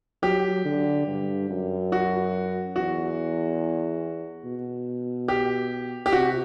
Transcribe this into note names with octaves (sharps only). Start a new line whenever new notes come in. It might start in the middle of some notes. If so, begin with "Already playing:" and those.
F#3 G4
D3
G2
F#2
F#4
E2 F#4
B2
G4
G4
C3 F#4